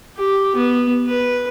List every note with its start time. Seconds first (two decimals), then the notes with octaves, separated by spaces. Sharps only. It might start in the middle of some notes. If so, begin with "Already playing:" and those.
0.16 G4
0.55 B3
1.06 B4